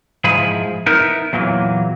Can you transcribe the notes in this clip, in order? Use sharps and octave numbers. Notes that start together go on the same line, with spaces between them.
G#2 F3 E4 G#4 B5
B3 D#4 E4 A#4
E2 A#2 E3 F#3